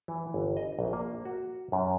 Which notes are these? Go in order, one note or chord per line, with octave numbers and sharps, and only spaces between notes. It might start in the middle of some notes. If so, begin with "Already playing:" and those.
E3
G1
D#5
A#1
A#3
F#4
F#2